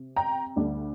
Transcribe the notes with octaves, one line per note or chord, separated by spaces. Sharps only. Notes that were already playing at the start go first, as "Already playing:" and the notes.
Already playing: C3
G5 A#5
D2 D3 G3 D4